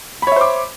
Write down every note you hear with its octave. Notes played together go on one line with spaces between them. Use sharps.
C5 C#5 E5 B5 D6